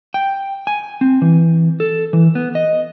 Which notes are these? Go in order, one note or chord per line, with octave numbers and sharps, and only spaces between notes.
G5
G#5
C4
E3
A4
E3
B3
D#5